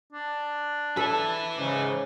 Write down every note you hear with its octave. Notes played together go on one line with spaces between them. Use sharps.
D4
A4 B4 E5
G#2 C#3 D6